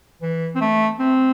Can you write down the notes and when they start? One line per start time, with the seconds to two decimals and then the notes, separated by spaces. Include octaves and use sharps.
0.22 E3
0.55 C4
0.61 A3
0.99 C4